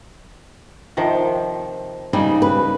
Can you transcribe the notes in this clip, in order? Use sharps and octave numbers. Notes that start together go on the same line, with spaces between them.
C3 D#3 F3
C#3 G3 D#4
B4